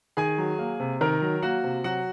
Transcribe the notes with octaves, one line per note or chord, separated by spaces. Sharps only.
D#3 G#4 G#5
F#3
A#3
C3
D#3 A#4 A#5
F#3
A#3 F#4 F#5
C3
F#3 F#4 F#5